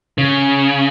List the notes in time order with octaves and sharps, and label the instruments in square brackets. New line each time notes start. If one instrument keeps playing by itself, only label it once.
[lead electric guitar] C#3